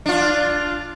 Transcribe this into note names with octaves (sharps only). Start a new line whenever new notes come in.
D4 F4